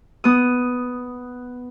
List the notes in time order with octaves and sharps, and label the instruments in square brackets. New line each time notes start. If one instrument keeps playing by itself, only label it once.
[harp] B3 D#6